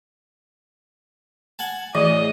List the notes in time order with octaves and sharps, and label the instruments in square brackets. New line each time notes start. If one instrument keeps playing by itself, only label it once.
[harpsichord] F#5 G#5 A5
[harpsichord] A2 [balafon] E3 [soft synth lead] G#4 [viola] D#5